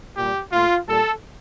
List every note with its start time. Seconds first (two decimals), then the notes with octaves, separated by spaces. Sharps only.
0.17 A#2 G3 G4
0.52 A#2 A3 F4
0.88 A#2 G3 A4